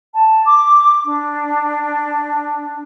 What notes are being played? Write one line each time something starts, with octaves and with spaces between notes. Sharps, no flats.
A5
D6
D4